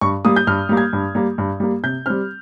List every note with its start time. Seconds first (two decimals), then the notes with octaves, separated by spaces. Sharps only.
0.01 G2 C#6
0.25 G3 A#3 D#6
0.36 G6
0.47 G2 F6
0.69 G3 A#3
0.77 G#6
0.93 G2
1.15 G3 A#3
1.38 G2
1.60 G3 A#3
1.83 C3 G6
2.06 G3 C4 F6